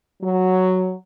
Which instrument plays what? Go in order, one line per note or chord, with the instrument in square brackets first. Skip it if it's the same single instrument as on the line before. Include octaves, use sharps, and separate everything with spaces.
[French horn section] F#3